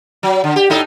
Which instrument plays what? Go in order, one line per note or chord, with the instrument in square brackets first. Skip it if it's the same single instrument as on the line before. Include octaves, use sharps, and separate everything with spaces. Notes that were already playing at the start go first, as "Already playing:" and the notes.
[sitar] F#3
D3
G4
A2 D#4 A4